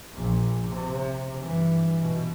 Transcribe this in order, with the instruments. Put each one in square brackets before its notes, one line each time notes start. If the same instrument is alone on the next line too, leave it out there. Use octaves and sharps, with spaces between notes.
[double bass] A#1 A#2
C3
G2 E3
B2